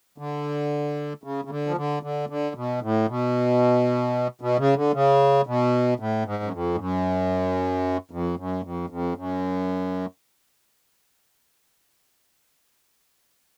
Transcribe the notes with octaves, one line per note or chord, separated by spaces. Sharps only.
D3
C#3
C#3
D3
F3
D3
D3
D3
B2
A2
B2
B2
C#3
D3
C#3
B2
A2
G#2
F#2
F2
G#2
F#2
F2
F#2
F2
F2
F#2